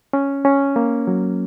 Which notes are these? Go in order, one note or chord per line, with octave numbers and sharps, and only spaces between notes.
C#4
C#4
A#3
F#3